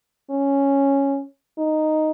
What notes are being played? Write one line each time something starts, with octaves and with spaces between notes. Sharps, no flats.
C#4
D#4